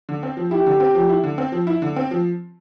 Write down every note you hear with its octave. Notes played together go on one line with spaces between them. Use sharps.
D3
C4
F3
E4 G4
D3
C4
F3
E4
D3
C4
F3
E4
D3
C4
F3